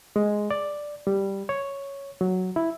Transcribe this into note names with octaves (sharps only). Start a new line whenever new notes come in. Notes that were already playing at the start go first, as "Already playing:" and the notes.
G#3
D5
G3
C#5
F#3
E4